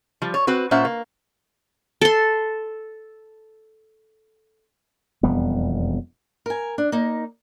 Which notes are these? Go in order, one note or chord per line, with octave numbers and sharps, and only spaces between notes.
F3 G3
C#5
C4 F#4 B4
A#2 C#4 C5 E5 F#5
A#3
A4 C6
E1 F2 G3 B3
A#4 G#5
D4
A#3 D#4